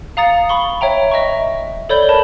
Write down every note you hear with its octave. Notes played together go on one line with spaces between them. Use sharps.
F5 A#5 D#6 A6 C#7
B5 C#6 G7
C#5 E5 G5 A#5
D#5 E5 A#5 C#6
A4 C#5 D5 B5 G6 G7
A#4 B4 A5 B5